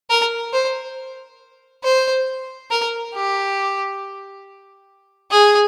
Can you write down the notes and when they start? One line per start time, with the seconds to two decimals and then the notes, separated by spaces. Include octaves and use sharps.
0.10 A#4
0.53 C5
1.84 C5
2.71 A#4
3.14 G4
5.31 G#4